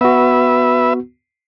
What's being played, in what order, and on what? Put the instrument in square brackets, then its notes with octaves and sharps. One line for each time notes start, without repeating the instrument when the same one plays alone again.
[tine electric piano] B3 F#4 [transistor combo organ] B4 E5